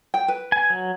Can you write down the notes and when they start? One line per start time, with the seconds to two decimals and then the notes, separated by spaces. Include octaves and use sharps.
0.14 G5
0.28 B4
0.52 G#5
0.70 F#3